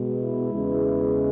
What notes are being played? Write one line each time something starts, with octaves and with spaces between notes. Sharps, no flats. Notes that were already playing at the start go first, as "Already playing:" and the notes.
Already playing: B2 G#3
E4
E2 C#3 E3 G#3